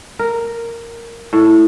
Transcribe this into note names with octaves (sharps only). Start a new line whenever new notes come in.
A#4
A2